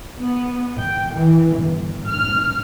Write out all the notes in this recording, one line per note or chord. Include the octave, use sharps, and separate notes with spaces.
B3
G5
E3
G1
F6